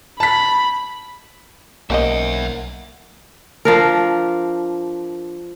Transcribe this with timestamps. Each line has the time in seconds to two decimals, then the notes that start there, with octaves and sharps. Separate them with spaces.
0.20 A5 B5 B6
1.90 B1 A#3 C#4 C5 D#5 E5 F#5
3.65 F3 D4 A#4